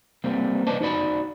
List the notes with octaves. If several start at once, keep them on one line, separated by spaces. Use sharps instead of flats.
G3 A#3 C4
B4 C5 D5 D#5 A5
D#4 F#4 D5 B5